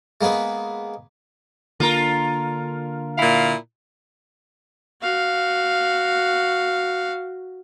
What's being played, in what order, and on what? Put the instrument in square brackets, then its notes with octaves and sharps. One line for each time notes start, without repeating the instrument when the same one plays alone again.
[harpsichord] G#3 A#3 B3 G#4 B4
[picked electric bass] D3 A#3 D4 [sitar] F4 A#4
[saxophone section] A#2 E4 F5
[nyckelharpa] F#4 F5